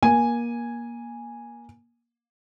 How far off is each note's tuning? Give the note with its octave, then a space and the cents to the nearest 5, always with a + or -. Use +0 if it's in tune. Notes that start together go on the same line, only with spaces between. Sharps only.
A#3 +25 G#5 -5